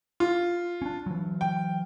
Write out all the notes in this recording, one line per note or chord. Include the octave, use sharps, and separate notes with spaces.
F4
C#4 D4
E3 F#3
G5